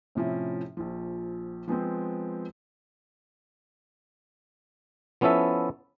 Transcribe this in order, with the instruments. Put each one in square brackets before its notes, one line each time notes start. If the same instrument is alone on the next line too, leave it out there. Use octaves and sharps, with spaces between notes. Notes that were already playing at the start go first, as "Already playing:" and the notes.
[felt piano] A2 C3 F3 C#4 E4
A#1 F3
F3 G#3 B3 C4
[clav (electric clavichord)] F3 B3 C#4 E4 A4 E5